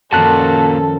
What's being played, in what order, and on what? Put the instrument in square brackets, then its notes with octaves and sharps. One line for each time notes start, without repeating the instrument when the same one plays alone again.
[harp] F#2 D#3 F3 [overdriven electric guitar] A#2 F#4 [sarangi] A4 [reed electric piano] A5 F#6